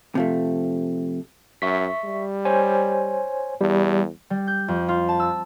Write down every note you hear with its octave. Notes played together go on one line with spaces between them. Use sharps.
C3 F3 A3
F#2 E5 C#6 B6
G3
C5 C#5 G#5
E2 G3
G3
G6
F2
F4
A5
E6